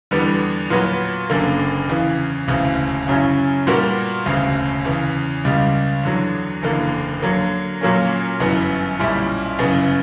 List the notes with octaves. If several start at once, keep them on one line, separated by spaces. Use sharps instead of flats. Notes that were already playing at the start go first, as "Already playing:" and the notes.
E2 D3 G3 B3
A#2 F#3 B3 F#4 B4
F#1 F#2 D3 A#3
E2 C#3 E3
E1 D2 C#3 E3
F#2 C#3 F#3 C#4 E4
A#2 G3 B3 F#4 A#4
E1 D2 C#3
E2 C#3 E3
C#2 C#3 G3
E2 D3 F#3
F#1 E2 D3 A#3
D3 F#3 A#3
A#2 F#3 A#3 C#4
G1 F#2 E3 B3
B1 A#2 G3 C#4 E4
G1 F#2 C#3 E3 B3